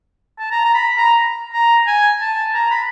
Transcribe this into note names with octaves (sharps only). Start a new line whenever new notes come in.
A5
A#5
A#5
B5
A#5
A#5
G#5
A5
A#5
B5